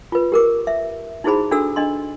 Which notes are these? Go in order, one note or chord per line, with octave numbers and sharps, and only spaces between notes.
F4 B4
G4 A#4 D6
E5
D#4 E4 F#4 G#4 C5 B5
D4 F#4 A4 E6
D4 D#5 C6